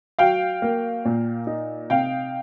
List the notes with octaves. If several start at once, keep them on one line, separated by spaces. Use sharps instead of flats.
F#3 F5 G5
A#3
A#2
D#4
C3 F5 G5